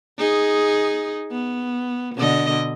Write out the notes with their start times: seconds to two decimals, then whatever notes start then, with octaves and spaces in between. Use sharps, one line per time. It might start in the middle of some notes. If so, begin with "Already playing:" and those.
0.18 D#4 G#4
1.31 B3
2.15 B2 D3 D#5